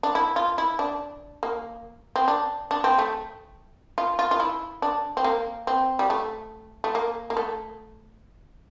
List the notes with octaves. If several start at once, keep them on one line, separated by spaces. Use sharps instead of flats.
D4
E4
F4
E4
D4
A#3
C4
D4
D4
C4
A3
F4
F4
F4
E4
D4
C4
A#3
C4
G3
A3
A3
A#3
A#3
A3